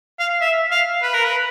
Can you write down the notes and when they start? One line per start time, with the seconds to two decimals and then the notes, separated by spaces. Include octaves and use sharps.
0.19 F5
0.41 E5
0.71 F5
1.02 B4
1.13 A#4
1.24 B4